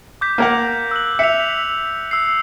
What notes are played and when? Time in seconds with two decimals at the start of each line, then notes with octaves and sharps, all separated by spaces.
0.21 D6 G6 B6
0.38 A#3 A#4 F#5
0.91 E6 F#6 F#7
1.19 E5 C#7 F7
2.11 E6 C7